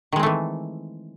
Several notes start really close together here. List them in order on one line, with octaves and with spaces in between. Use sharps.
D#3 G#3 C4 A3 E3